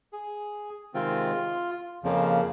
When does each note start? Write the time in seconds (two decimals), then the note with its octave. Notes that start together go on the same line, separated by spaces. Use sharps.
0.13 G#4
0.94 C3 D#3 G#3 C4 F4
2.03 F2 C#3 F3 A#3